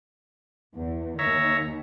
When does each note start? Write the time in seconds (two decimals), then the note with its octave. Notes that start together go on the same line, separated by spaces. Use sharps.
0.76 E2
1.19 D#2 D#3 C#5 E5 A#5